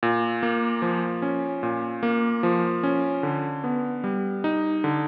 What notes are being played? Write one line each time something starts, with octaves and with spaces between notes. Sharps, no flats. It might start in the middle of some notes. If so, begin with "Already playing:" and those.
A#2
A#3
F3
C#4
A#2
A#3
F3
C#4
D3
B3
G3
D#4
D3